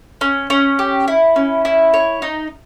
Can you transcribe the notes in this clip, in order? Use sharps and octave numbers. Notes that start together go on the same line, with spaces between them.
C#4
C#4
G4
E4
C#4
E4
C#5
D#4